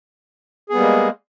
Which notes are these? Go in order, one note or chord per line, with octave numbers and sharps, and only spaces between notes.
G3 G#3 A#3 B3 G#4